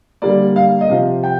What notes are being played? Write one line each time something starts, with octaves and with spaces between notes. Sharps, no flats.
D3 G3 A#3 D5
F5
D#5
C3 F3 C4 F5
G5